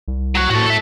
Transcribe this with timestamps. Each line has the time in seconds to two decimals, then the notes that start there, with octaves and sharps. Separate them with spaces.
0.08 C2
0.35 F#3 F#4
0.50 A2 F#4 A4
0.66 A4 E5